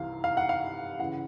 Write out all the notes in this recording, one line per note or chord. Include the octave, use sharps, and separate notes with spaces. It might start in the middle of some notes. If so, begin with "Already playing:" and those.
Already playing: C2 C3 E3 F5
F5
F#5
F5
C#3 E3 F#5